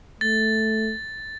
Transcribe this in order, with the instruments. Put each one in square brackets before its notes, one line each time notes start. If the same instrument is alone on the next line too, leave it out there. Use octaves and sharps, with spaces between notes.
[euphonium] A3 [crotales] A6